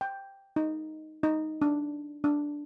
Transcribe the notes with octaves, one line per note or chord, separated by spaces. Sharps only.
G5
D#4
D#4
D4
D4